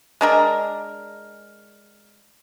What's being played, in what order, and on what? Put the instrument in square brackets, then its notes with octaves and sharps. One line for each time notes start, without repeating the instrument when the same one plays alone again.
[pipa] G#3 D4 A#4